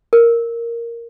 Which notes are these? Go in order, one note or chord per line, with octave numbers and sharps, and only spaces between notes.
A#4